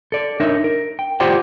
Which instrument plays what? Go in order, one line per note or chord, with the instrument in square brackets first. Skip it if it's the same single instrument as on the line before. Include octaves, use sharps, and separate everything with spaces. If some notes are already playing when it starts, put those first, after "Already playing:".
[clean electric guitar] A4 D5
D4 D#4 A#4 C#5 E5
A#4
G5
F4 G4 C5 D5 F#5 G5